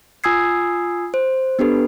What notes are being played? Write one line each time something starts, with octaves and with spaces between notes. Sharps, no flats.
F4 G#5 D#6 E6 G#6 C7
C5
B3 D4 G4 A4 B4